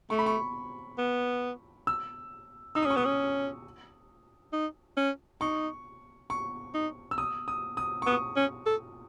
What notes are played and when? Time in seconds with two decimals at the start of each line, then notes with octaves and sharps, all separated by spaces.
0.10 A3 C#6
0.19 B5
0.26 C#6
0.98 B3
1.87 E6
2.75 D#4 E6
2.83 D#6
2.86 C#4 C#6
2.96 B3 D#6
3.05 C#4
4.52 D#4
4.97 C#4
5.41 D#4 C#6
6.30 C#6
6.74 D#4
7.11 E6
7.18 D#6
7.48 D#6
7.77 D#6
8.02 C#6
8.06 B3 D#6
8.36 C#4
8.66 A4